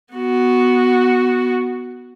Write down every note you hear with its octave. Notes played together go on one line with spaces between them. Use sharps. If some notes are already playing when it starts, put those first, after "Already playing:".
B3 F#4